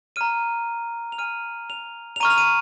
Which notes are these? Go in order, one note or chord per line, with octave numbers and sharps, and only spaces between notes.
A#5 F6 D#7
F7
G#5 F6 D#7
F7
F7
A#5 C#6 F6 D#7
F7
D#7